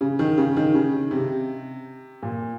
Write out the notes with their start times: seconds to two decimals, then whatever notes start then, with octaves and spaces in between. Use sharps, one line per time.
0.01 C#3
0.19 D#3
0.38 C#3
0.57 D#3
0.74 C#3
1.11 C3
2.23 A#2